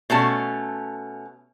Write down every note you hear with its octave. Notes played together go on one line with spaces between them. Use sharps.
B2 A3 C#4 A5